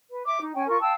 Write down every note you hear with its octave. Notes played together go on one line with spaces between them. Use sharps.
B4
E5 D6
D#4
C#4 G5 G#5
F4 A#4 C#6
F5 G5 A5 E6